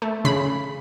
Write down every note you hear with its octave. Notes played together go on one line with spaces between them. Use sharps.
A3
C#3 B5